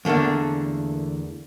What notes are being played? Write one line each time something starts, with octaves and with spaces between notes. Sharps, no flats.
E2 D3 A3 A#3 D4